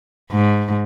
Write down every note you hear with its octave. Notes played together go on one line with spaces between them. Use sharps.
G#2